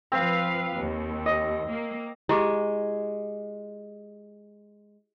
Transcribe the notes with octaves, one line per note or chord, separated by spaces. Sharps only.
F3 C4 B4 F5
D#2
D#5
A#3
G#3 E4 G4 D6